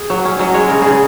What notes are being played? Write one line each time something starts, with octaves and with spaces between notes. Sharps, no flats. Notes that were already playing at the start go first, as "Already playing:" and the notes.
Already playing: G#4
F#3
C#4
F#3 D#5
G#3 C#5
C#3 A#4
C#3 G#4